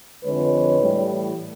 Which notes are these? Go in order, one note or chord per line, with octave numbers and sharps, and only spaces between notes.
F2 D3 F3 G#3 B4 C#5
A2 E3 G3